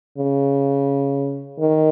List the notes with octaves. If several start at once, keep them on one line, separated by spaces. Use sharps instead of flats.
C#3
D#3